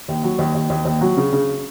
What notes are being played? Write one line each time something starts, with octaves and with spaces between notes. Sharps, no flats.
D#2
F#3
D#2
D#2
D#2
D#2
F#3
C#3
C#3